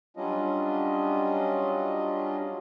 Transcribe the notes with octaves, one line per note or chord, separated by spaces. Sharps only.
F#3 G3 C#4 D4 F4 D#5